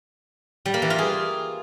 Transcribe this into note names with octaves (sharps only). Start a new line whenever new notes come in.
G3
A#3
E3
F4
G#4